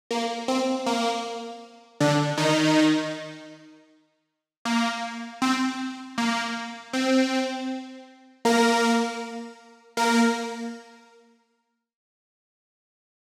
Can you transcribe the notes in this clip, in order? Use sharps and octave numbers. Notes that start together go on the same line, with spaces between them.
A#3
C4
A#3
D3 D4
D#3 D#4
A#3
C4
A#3
C4
A#3 A#4
A#3 A#4